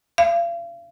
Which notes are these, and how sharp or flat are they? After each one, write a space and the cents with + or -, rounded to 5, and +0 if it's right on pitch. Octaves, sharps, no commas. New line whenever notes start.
F5 -40